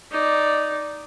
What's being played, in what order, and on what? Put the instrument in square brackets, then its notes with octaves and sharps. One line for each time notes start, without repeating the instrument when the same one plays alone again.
[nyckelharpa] D#4 D5